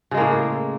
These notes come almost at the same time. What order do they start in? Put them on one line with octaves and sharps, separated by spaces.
C#3 G#3 A#3 A2